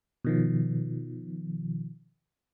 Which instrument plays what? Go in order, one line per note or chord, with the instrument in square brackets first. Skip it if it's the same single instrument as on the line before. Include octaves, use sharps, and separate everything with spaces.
[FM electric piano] B2 D#3 F3